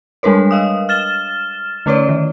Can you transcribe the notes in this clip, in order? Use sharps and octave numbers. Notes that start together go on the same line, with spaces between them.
G3 G#3 D4 A#4 B4 C#5
D#5 F5 D#6
F6 A6 E7 G7
D3 A3 C#4 B4 C#5 D5
D#3